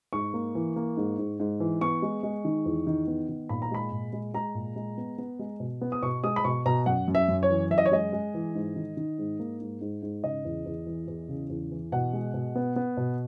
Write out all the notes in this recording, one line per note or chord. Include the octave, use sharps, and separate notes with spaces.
G#2 C#6
A#3
E3
A#3
G#2
G#2
G#2
E3
B3 C#6
G#3
G#3
D#3
E2
D#3
B3
D#3
A#2 B5
A#5
G#3 B5
A#2
G#3
G#3 A#5
A#2
G#3
B3
B3
G#3
B2
B3
D#6
B2 C#6
G#3 D#6
B5
B2 C#6
B2 A#5
F#2 F#5
F#2
E5
F#2
C#5
E3
F#2 E5
D#5
C#5
G#3 D#5
G#3
E3
G#2
D#3
D#3
G#2
A#3
G#2
G#2
G#2
C#3 D#5
E2
E2
E3
E2
C#3
E2
E3
B2 F#5
G#3
B2
B3
B3
B2